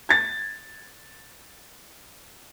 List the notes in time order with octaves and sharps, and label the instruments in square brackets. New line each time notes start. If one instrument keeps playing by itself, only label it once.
[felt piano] G#6 A6